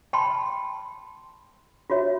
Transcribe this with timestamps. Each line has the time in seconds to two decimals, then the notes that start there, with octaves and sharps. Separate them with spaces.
0.13 G5 A5 B5 C6
1.90 F4 F#4 C#5 E5